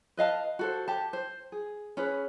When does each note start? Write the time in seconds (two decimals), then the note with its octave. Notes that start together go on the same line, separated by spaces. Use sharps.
0.17 B4 D#5 F5 A5
0.59 F#4 A4 C5
0.88 G4 A5
1.13 C5
1.52 G#4
1.97 C#4 G#4 B4